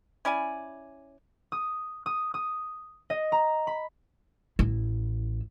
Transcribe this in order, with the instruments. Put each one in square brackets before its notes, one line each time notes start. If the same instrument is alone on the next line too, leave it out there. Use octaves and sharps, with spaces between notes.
[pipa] C#4 E4 D5 G#5
[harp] D#6
D#6
D#6
D#5
A#5
B5
[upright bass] A1 E4